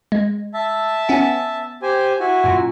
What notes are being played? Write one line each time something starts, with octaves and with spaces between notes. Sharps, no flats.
G#3
E5 A5
B3 C#4
G4 C5 G#5
E4 F#4 G#5
F#2 A#2